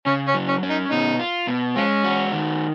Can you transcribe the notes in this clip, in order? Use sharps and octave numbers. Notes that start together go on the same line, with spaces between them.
C#3 C#4
C#4
F#3
C#4
C#4
D#4
B2 D#4
F4
B2
F3 G#3 C#4
F#4
D#3